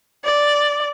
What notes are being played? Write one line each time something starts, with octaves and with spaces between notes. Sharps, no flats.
D5